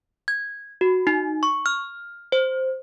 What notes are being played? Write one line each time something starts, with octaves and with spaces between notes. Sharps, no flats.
G#6
F#4
D#4
C#6
F6
C5